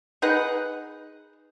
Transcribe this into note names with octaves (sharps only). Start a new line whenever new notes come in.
D#4 G#4 B4 F#5